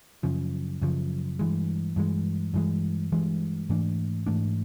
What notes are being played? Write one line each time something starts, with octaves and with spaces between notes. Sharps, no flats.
F#2 C#3 F3
F#2 C#3 F3
G2 E3 G#3
G2 E3 G#3
G2 E3 G#3
G2 E3 G#3
G#2 E3 A3 D4
G#2 E3 A3 D4